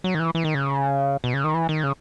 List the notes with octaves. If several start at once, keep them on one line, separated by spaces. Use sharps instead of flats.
F#3
D#3
E3
E3
D#3
C#3
B2
C#3
D#3
E3
D#3
C#3